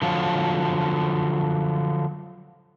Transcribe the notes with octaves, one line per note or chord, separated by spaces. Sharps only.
D3 F3 F#3